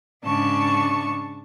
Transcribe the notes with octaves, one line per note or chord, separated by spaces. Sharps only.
G#2 C#3 D4 A5 C#6